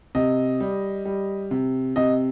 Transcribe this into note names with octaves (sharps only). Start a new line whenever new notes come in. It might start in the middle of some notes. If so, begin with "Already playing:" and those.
C3 D#5
G3
G3
C3
C3 D#5